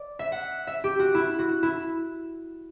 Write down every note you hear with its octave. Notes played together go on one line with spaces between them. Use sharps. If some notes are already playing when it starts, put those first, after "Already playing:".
Already playing: D5
E5
F#5
E5
G4
F#4
E4
F#4
E4